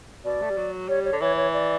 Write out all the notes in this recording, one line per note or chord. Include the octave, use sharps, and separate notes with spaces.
B2 D5
A3
G3
F#3
G3 C#5
C#5
D3
E3 C#5
C#5
D5